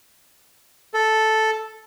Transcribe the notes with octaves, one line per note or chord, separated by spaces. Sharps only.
A4